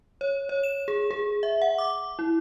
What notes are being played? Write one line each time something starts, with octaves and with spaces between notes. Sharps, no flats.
C#5
C#5
E7
G#4
G#4
E5
F#5
D6
E4